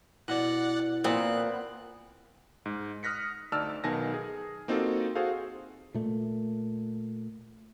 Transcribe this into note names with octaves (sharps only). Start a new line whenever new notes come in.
B2 E4 D5 F#5 F#6
A#2 B3 C4 F#6
G#2
D#6 F6 F#6 A#6 B6 C#7
D2 D#4 D5 A5 E6 F6
B1 D#3 B3 G#5 A5 A#6
G#4
A#3 C4 D#4 F4 F#4 A4
F#4 G#4 A4 C5 F5
A#2 A3